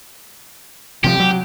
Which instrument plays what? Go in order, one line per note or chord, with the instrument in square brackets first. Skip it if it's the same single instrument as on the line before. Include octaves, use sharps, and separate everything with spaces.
[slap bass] C3 F3 [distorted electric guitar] G4
[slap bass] F#3